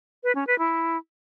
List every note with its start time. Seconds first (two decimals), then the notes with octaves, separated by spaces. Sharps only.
0.23 B4
0.35 C#4
0.47 B4
0.59 E4